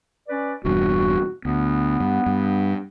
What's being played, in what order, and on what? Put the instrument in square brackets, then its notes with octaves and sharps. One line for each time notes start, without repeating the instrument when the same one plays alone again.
[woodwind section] C#4 B4 D5
[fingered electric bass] E1 E2 G2 [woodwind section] F#4
[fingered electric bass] D2 [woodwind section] B3
[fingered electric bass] G2
G2